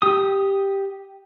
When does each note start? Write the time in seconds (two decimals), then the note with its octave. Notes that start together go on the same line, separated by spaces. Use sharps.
0.02 G4 D#6